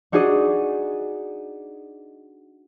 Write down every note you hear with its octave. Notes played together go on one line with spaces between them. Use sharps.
D4 D#4 F#4 G#4 D5 D#5